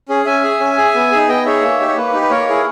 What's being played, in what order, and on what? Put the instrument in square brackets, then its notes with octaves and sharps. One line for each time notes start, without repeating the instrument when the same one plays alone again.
[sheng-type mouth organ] C#4 G#4
C#4 E5 G#5
G#4
C#4
G#4
B3
D#4 G#4
B3 D#5 G5
D#4 G#4 C#5 E5
A#3
D#4 G4
C#5
A#3 B4
D#4 G4
B4
A#3 A#4 C#5
E4 G#4